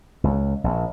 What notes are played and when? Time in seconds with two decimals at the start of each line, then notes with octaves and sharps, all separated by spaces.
0.24 C#2
0.64 A#1